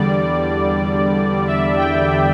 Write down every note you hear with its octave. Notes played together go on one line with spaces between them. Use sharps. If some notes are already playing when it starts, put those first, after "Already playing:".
Already playing: E2 D3 G3 D5
E5
G5